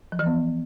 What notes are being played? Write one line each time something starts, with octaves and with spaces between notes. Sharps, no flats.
F3
E3
B3